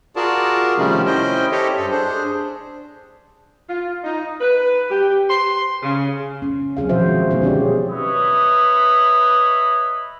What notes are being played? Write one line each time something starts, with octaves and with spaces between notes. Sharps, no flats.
F4 F#4 G#4 A#4 D5 A5
C3 D#3 F3 G3 A3 C#4
C#4 E4 C5 D#5 G5
G4 A4 C5 C#5 D#5 E5
G2 A4
D4 G#4 C5
F4
D#4
B4
G4
C6
C#3
C#4
F#3 C4 G#4 F5
B2 D#3 F3 F#4 C5 E5
G#3
D3 F3 B3 D#4 G#4 C5
C#4 G4 C#5 D5
B4 C#5 D#5 E5 B5